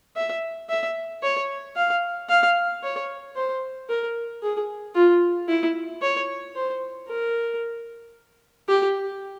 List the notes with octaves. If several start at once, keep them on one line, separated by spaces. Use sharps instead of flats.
E5
E5
C#5
F5
F5
C#5
C5
A#4
G#4
F4
E4
C#5
C5
A#4
G4